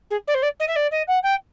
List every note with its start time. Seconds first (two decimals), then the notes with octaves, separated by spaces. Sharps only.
0.10 G#4
0.27 D5
0.34 C5
0.42 D5
0.60 D#5
0.68 E5
0.76 D5
0.91 D#5
1.08 F#5
1.23 G5